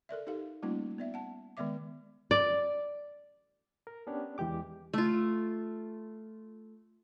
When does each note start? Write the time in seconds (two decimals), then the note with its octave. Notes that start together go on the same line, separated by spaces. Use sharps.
0.09 A4 A#4 D5 E5
0.27 D#4 G4 A4 F5
0.63 G3 A3 A#3 C#4 D#4 F4
0.98 B3 D5 E5
1.14 F#5 A5
1.57 D#3 G#3 B3 D5 E5 D6
2.31 D5
3.87 A#4
4.07 B3 C#4 D4 G4 C#5 D5
4.38 E2 E3 G#3 G4 D6
4.94 A3 F4